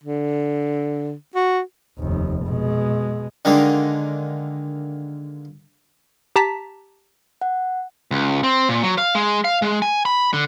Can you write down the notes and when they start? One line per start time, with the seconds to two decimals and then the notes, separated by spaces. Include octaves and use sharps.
0.04 D3
1.35 F#4
1.98 F1 D#2
2.45 B2 G#3
3.45 D3 D#3 G#3 A#3
6.36 G4 A5 A#5 B6
7.41 F#5
8.11 C#2
8.43 C4
8.69 A#2
8.83 F#3
8.98 F5
9.15 G#3
9.44 F5
9.62 G#3
9.82 G#5
10.05 B5
10.33 D3